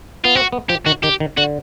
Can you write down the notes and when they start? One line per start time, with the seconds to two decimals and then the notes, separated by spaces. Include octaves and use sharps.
0.24 B3 F4
0.35 C4 F#4
0.52 B3
0.69 F3 G4
0.86 D#3 F#4
1.03 D#3 G4
1.20 D#3
1.37 D3 F#4